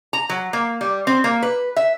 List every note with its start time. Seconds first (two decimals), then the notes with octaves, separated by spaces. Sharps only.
0.13 A#5
0.29 F#3
0.53 A#3
0.81 G3
1.07 C4
1.24 A#3
1.43 B4
1.76 E5